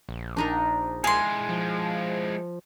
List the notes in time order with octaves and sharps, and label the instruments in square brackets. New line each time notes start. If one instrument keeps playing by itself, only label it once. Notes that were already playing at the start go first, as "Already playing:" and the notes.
[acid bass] A#1
[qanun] D4 D#4 A#4
[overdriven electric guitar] G#3 E4 [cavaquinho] G#4 C6 [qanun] F5
[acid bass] F3